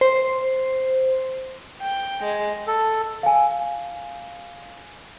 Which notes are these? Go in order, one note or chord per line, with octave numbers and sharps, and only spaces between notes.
C5
G5
G#3
A4
F5 G#5